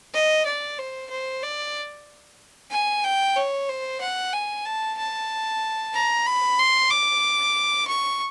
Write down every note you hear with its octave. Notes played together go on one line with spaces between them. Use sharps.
D#5
D5
C5
C5
D5
G#5
G5
C#5
C5
F#5
G#5
A5
A5
A#5
B5
C6
D6
C#6